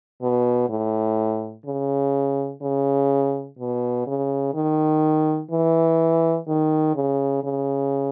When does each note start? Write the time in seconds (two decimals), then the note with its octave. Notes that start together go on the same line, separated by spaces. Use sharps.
0.22 B2
0.69 A2
1.65 C#3
2.61 C#3
3.59 B2
4.07 C#3
4.54 D#3
5.51 E3
6.47 D#3
6.96 C#3
7.44 C#3